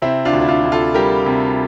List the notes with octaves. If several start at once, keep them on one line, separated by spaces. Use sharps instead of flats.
C3 C4 E4
D4 F4
D2
E4
D4 F4
D2
F4 A4
G3 G4 A#4
C3